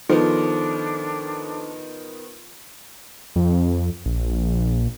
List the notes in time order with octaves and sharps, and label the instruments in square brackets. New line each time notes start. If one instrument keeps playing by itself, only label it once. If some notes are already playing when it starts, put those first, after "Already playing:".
[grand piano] D#3 B3 [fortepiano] F3 [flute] D4 [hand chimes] D#4 A4 C5
[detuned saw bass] F2
A#1